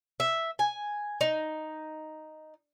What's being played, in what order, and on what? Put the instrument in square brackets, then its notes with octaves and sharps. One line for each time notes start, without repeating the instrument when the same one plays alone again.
[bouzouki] E5
G#5
D#4